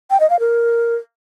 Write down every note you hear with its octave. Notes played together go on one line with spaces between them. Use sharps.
G5
D#5
F5
A#4